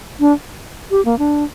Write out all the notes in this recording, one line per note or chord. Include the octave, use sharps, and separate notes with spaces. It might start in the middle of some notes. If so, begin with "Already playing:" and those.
D4
G4
A#3
D4